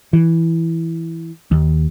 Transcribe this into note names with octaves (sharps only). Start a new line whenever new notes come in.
E3
D#2